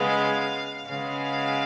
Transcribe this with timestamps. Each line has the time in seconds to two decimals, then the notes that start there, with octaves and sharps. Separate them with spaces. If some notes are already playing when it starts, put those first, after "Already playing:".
Already playing: C#3 G#3 B3 F5
0.86 C#3 G#3 B3 F5